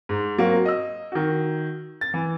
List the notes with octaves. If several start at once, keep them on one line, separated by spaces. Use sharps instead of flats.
G#2
F#3 A#3 C4 F#4
D#5 E6
D#3 F#4
A6
E3